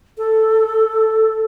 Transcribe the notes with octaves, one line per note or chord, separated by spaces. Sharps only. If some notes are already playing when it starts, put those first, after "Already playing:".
A4